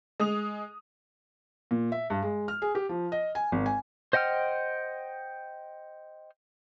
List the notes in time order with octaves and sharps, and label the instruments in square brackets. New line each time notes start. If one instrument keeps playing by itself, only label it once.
[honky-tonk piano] G#3 D#6 F7
[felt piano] A#2
E5
G2
G#3
F6
G#4
G4
F3
D#5
G#5
G#1
G#5
[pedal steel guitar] C5 D#5 F#5 G5 F6